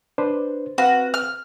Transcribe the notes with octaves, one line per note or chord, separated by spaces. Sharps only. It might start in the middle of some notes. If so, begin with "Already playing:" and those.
D4 B4 C5
C4 F#4 B4 F5
F6